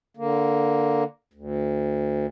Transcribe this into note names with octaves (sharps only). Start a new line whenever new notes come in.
D3 A#3
D2